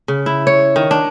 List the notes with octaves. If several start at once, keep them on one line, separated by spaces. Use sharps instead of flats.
C#3
E4
C#5
D#3
D4